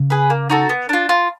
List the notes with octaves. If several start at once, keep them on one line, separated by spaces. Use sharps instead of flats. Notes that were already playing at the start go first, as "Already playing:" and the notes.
Already playing: C#3
G#4 B4
A#3
D#4 F#4 A4
B3
D4 F4
F4